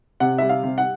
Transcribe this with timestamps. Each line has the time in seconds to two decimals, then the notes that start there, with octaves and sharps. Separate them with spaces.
0.20 C3 F#5
0.38 G3 E5
0.49 F5
0.63 C3
0.78 F#5